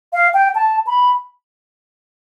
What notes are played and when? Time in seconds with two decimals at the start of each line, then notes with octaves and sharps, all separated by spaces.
0.13 F5
0.34 G5
0.55 A5
0.87 B5